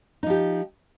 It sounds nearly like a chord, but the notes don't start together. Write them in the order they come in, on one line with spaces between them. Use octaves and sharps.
D#4 F3 G4